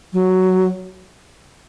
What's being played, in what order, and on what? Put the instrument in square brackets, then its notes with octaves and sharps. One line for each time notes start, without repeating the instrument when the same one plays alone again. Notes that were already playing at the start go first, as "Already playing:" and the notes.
[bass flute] F#3